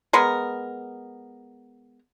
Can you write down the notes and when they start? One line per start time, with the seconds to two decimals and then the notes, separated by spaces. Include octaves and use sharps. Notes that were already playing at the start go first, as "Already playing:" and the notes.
0.13 G#3 B3 A#4